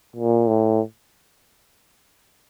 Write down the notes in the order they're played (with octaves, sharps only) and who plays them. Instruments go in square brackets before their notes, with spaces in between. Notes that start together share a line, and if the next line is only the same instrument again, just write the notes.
[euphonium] A#2
A2